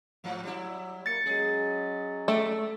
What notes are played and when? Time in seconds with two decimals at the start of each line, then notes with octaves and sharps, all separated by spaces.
0.24 G#2 F3 F#3
0.43 F#3 G3 E4
1.06 A#3 A6 C#7
1.26 F#3 G#3 C#4 G#4
2.28 A3 D5